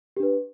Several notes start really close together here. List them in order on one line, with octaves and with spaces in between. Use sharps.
G4 D4 B4